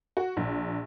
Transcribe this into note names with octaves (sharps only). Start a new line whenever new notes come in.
F#4
A#1